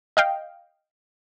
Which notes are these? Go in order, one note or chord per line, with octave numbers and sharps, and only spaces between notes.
D#5 F5 G5